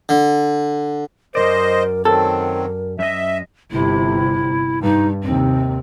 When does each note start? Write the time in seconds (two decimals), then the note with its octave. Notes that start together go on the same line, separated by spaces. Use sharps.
0.09 D3
1.35 F#2 C#3 A#4 C5 D5 D#5
2.05 D#3 F#3 C4 A4 A#4
2.99 F#2 D#5 E5
3.71 G1 C3 E4
4.82 G2 D#4
5.23 D#2 C3 C4